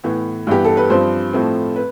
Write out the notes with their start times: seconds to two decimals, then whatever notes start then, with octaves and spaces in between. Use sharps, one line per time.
0.04 A2 E3 B3
0.47 G2 E3 B3 G4
0.65 A4
0.77 B4
0.90 G2 F3 C4 C5
1.33 A2 F3 A3 C4
1.76 B4